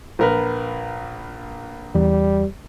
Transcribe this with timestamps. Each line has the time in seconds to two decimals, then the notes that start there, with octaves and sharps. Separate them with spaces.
0.19 A#1 A#4 B4
1.95 E2 G3